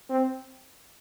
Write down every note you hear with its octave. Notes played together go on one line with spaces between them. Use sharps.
C4